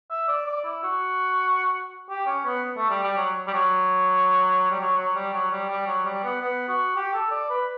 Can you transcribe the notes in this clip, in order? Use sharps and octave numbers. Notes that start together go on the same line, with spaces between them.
E5
D5
D5
E4
F#4
G4
C#4
B3
A3
G3
G3
F#3
G3
F#3
G3
F#3
F#3
G3
F#3
G3
G3
F#3
G3
B3
B3
F#4
G4
A4
D5
B4